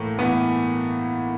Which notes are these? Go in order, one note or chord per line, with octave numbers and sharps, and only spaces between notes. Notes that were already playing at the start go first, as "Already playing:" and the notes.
Already playing: A2 E3 A3 A#3
A2 E3 B3